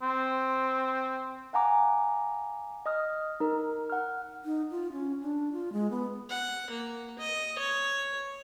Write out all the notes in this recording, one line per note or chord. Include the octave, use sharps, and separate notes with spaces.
C4
F5 F#5 G#5 A#5 D6
D#5 D#6 F6
D#4 A#4
F#5 F6
D#4
F4
C#4
D4
F4
G#3
B3
F#5
A#3
D#5
C#5